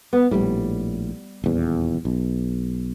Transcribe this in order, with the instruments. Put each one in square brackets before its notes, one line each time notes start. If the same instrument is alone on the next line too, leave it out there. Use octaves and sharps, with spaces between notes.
[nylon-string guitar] B3
[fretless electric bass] A#1 A2 [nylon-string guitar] G3
[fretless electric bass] D#1 E2
B1